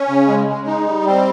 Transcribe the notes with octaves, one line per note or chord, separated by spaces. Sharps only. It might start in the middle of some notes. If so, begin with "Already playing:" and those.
Already playing: C#4
C#3
G#3
G#3
D#4
G3
C4